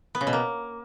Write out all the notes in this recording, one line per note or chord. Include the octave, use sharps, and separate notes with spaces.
B3
C#3
B2
A#3